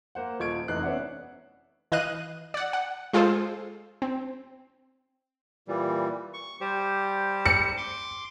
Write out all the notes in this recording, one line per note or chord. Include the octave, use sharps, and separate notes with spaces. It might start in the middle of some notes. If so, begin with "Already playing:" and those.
A#3 C5 F#5
D#1 F3 C#6 G#6 D7
F1 E3 D#4 F#6 C7
B3 C#4 D5 E5 F#5
E3 D#5 F5 F#6 D#7
D5 F#5
F#5
G#3 F4 G#4 A4 C5
C4
A#2 E3 G3
C#6
G3 G4 C5
C#7
C6 D6